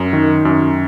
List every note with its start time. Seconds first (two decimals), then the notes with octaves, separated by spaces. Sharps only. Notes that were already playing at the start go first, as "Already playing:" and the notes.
Already playing: F#2
0.13 D#3
0.45 F#2